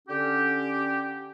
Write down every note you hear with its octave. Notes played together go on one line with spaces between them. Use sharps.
D3 C#4 G4